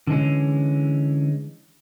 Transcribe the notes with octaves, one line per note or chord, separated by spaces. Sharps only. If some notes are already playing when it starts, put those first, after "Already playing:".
D3 E3 G#3 C#4